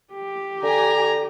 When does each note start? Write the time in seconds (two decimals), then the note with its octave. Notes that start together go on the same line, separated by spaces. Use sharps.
0.13 G4
0.63 D3 G#5 A#5